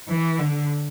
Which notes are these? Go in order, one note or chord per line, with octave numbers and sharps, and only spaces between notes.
E3
D3